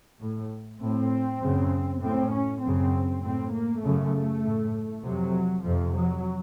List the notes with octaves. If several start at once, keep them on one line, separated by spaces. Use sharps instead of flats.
A2
A2 C4
F#2 C#3
A2 C4
C#4
F#2 C#3 C4
A2 C4
A#3
F#2 C#3 A3
A2
F2 C3 F#3
F2 C3 F3
F#3